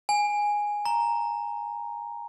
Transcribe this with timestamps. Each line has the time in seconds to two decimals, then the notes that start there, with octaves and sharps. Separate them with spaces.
0.09 G#5
0.85 A#5